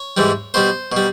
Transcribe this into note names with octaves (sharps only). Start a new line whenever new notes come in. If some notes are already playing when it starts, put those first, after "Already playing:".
Already playing: C#5
G#2 E3 G3
B2 G3 C5
B2 G3